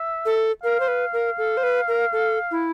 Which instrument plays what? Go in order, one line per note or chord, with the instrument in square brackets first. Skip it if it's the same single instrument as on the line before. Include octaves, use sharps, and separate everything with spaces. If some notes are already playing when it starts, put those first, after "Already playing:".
Already playing: [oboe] E5
[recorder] A4
[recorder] A#4 [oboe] F5
[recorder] C5
B4
A#4
A4
C5
B4
A#4
A4
E4